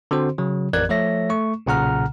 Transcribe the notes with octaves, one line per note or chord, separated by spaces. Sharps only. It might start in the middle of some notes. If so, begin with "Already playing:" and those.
D3 C4 F#4 C5
C#3 F#3
A1 F2 A#4 D5 F#6 G#6
F3 A3 A4 C#5 E5 A#6
A3 C#6
B1 A#2 C#3 F#5 A#5 F6